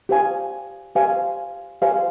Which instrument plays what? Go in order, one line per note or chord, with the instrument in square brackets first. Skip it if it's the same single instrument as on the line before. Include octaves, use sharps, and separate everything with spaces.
[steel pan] G4 C5 F5 G#5
G4 C5 F5 G#5
G4 C5 F5 G#5